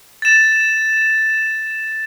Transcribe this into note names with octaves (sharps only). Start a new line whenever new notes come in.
A6 E7